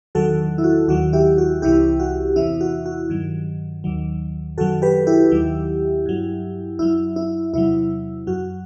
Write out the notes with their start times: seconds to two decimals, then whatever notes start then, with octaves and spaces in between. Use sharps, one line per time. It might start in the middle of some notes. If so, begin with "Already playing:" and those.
0.15 E2 D#3 F#3 F#4 A4
0.58 E4
0.64 F#4
0.88 D#2 D#3 F#3 F#4
1.13 E4 G4
1.38 F#4
1.62 C2 C3 E3 E4 G4
2.00 F#4
2.36 E2 C3 E3 E4
2.61 F#4
2.86 F#4
3.10 G2 D#3 F#3
3.84 D#2 D#3 F#3
4.57 F#2 D#3 F#3 F#4 A4
4.82 G4 B4
5.07 E4 G4
5.32 D#2 D#3 F#3
6.06 G2 F#3
6.79 F#2 F#3 E4
7.16 E4
7.53 E2 C3 F#3 E4
8.27 F#2 F#3 F#4